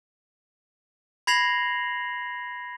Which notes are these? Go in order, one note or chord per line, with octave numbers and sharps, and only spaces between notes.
B5 G#6 A#6 C7 F7 F#7